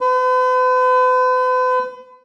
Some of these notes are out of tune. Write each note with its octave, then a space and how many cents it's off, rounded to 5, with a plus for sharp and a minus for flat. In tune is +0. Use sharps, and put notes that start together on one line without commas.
B4 +45